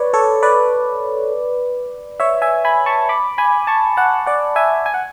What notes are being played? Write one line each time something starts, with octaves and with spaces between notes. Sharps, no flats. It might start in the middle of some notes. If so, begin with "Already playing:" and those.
Already playing: B4 C#5 D5
A4 C#5
B4 D5
C#5 E5
E5 G#5
G#5 B5
A5 C#6
B5 D6
G#5 B5
A5 C#6
F#5 A5
D5 F#5
E5 G#5
G#5
F#5